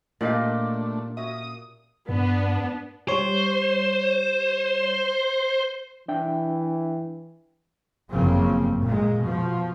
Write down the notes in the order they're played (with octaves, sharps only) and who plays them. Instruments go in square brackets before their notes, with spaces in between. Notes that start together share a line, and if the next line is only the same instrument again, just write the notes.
[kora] A#2 G4 [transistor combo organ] A3 D4 [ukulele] D5 D#5 F5
[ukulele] C#4 F#4 E5 [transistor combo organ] D#6
[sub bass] G2 [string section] B3 D4
[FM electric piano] G3 C#5 [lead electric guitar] C5
[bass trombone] E3 [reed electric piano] D4 E5 G5
[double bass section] G1 F#2 C#3 F3 A#3 C4
A#2 G#3
B2 F3